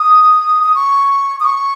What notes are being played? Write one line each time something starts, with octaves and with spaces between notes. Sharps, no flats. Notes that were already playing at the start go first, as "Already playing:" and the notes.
Already playing: D#6
D#6
C#6
D#6
C#6